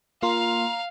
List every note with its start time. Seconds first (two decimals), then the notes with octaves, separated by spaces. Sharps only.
0.23 A#3 F4 F5 A#5 C6